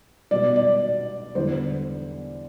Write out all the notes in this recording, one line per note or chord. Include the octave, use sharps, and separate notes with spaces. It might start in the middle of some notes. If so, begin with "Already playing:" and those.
B2 G3 D5
D5
E2 D3 G3 C5